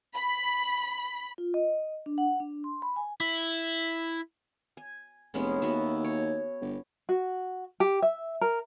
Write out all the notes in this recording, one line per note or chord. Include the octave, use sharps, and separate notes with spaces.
B5
F4
D#5
D4
F#5
D4
C6
B5
G#5
E4
G#5
F1 G#3 B3 C#4
D#2 B3 F#4 E5
C#5
G1
F#4
G4
E5
A#4